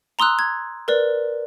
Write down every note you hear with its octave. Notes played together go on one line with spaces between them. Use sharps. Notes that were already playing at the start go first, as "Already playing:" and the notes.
A#5 C6 D#6 E6 F#6
G#6
A#4 B4 D5